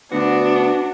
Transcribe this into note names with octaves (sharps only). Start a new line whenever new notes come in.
D2 B3 D4 F#4